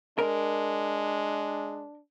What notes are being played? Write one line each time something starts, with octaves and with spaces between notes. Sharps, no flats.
G#3 D4 A#4